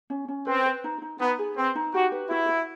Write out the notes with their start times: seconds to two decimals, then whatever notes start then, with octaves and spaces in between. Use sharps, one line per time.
0.10 C#4
0.28 C#4
0.47 C4 B4
0.66 B4
0.84 D#4
1.02 D#4
1.20 B3 D#4
1.39 G#4
1.57 C4 B4
1.75 D#4
1.94 F#4 G4
2.12 B4
2.30 E4 F#4
2.49 F#4